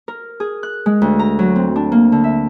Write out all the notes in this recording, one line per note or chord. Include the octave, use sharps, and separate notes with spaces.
A#4
G#4
F#6
G#3
D2
A#5
F#3
C4
D4
A#3
D3
E5